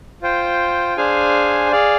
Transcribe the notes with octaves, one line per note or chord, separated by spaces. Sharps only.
F4 C5 G5
D4 G#4 C5 F5 G#5
G#4 D5 F5